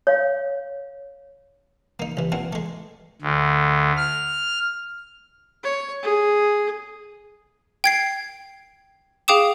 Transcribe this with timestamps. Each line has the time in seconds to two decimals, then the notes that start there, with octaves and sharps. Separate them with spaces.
0.07 C#5 F5
2.00 A#3 D#4
2.17 C2 E3
2.32 A#2 E3 C4 F#5
2.53 G#3 A3
3.22 D2
3.97 F6
5.63 C#5
6.03 G#4
7.84 G5 G#6 C7
9.28 G#4 F5 G5 D6 D#6 E7